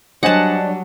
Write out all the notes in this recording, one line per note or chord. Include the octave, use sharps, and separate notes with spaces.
F#3 G3 D4 C5 D#5 F#5 G#5 A5